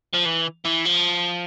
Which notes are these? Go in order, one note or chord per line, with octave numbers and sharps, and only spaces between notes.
F3
E3
E3
F3